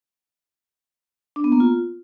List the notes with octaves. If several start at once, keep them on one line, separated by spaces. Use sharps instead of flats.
D4
B3
A#3
F4